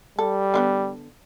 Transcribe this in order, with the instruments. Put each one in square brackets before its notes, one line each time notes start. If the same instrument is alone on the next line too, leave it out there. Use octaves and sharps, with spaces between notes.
[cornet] G3 [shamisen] A4
[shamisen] D3 A#3 B3